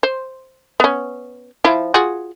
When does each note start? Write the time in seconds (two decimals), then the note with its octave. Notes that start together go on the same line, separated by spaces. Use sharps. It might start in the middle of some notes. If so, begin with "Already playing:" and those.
0.03 C5
0.80 B3 C#4
1.65 F3 E4
1.94 F4 F#4 G#4